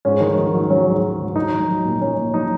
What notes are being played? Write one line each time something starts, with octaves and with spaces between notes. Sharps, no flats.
G#2 C#4
D#3
D#3
F#3
F#3 C#4
G#2
G#2
D#3
F#3 D#4
F#3
F#3
A#2
A#2 C#4
A#2
F#3 D#4